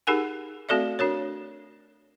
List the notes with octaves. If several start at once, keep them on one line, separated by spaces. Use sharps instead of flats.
D#4 G4 G#4 A#4 F#5 G#5
A3 C4 F#4 A4 D5 E5
D4 F#4 A#4 C#5